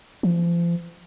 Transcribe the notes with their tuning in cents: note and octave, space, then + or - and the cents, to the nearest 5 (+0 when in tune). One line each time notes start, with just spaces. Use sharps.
F3 -35